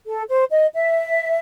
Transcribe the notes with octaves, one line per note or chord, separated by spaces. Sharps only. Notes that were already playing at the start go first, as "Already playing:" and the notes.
A4
C5
D#5
E5